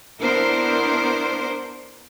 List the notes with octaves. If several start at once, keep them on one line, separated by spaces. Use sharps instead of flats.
B3 D4 E4 A#4 C5